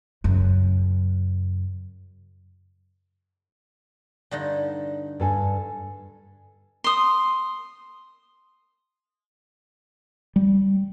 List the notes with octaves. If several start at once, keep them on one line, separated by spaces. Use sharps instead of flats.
F#2 C#3
G2 D3 D#4
G2 A4 G#5
C6 D#6
G3